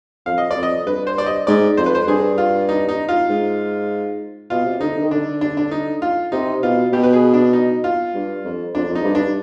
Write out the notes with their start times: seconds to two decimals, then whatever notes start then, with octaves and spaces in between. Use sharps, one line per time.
0.26 F2 F5
0.38 D#5
0.51 D5
0.57 F2
0.63 D#5
0.86 G2 B4
1.07 C5
1.18 D5
1.26 D#5
1.47 G#2 D5
1.77 F2 C5
1.86 B4
1.95 C5
2.07 G2 G#4
2.38 F4
2.69 D#4
2.89 D#4
3.09 F4
3.30 G#2
4.50 B2 F4
4.66 C3
4.80 D3 D#4
4.96 D3
5.03 D#3
5.10 D3 D4
5.41 D4
5.57 D4
5.71 D#4
6.02 F4
6.32 C3 D#4
6.62 B2 F4
6.92 B2 G4
7.03 B4
7.13 G#4
7.33 D4
7.53 D#4
7.84 F4
8.14 G2
8.45 F2
8.75 F2 D4
8.89 F2
8.95 D#4
9.05 G2
9.15 D4